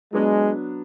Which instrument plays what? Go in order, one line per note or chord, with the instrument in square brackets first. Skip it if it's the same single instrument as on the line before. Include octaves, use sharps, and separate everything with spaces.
[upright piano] F#3 B3 D4 [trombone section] G#3